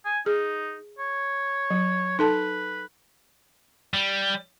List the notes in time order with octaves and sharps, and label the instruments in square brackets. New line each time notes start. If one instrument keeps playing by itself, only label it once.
[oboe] G#5
[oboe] D#4 [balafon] G#4
[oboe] C#5
[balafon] F#3
[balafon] D#4 A4 A5 [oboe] B4
[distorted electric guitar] G3